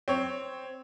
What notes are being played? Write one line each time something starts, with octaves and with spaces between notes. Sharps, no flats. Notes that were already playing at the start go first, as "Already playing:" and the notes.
C4 C#5